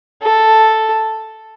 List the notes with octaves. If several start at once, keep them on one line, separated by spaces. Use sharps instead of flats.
A4